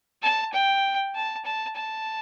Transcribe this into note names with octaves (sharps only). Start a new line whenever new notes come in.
A5
G5
A5
A5
A5